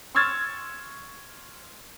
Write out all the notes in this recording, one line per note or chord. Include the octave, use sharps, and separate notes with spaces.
C6 C#6 E6 F6 G#6 A6